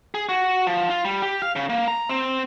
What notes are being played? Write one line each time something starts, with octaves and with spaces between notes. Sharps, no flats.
G#4
F#4
F3
F4
G3
G4
F5
C#3
A#3
A#5
C4